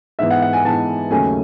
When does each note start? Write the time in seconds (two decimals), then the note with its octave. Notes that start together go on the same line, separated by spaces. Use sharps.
0.19 G#2 E3 B3 E5
0.30 F#5
0.42 F#5
0.53 G#5
0.64 G#2 E3 B3 A5
1.11 D#2 C#3 F#3 A3 C#4 G#5